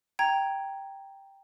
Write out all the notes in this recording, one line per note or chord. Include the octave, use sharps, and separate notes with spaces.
G5 A#5 G#6